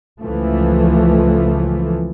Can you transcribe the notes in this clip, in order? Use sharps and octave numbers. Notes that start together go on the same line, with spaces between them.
C#2 E3 F3 A3